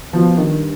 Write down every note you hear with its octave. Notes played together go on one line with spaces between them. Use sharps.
B2 F3
G2 D#3